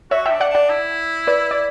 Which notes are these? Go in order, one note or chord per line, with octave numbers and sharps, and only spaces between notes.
F#4 C#5 E5
E5 G5
D4
D5 F#5
D4
D5 F#5
E4
B4 D5
D5